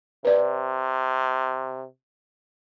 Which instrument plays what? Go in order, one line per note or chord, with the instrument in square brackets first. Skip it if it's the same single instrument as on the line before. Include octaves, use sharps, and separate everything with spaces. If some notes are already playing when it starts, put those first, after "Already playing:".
[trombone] C3 [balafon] B4 D5